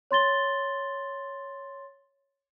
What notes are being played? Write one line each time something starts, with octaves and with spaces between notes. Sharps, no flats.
C#5 C6 A6 G7